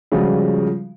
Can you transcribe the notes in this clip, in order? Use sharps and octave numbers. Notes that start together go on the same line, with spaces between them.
C#3 F3 G3 G#3 F4 F#4